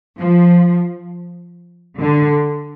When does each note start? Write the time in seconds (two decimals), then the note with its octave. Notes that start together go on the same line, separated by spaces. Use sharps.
0.17 F3
1.99 D3